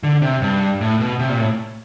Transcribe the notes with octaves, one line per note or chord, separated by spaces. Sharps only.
D3
C3
G2
A2
B2
C3
A#2
A2